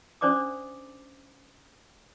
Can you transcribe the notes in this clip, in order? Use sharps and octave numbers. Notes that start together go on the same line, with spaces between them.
C#4 D4 C5 D5 D6 D#6